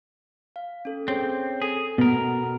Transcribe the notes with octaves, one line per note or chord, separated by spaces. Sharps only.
F5
C#4 A4
C4 G#4 C#5
G#4 A4 G#6
B2 B3 A#4